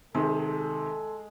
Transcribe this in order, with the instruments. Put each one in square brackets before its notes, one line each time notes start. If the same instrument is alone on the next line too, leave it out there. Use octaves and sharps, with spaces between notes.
[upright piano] C3 D#3 [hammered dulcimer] G#3 [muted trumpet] A4